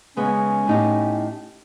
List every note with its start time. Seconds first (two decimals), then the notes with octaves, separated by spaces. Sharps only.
0.17 C#3 G#3 B3 C#4
0.67 A2 D#4 G4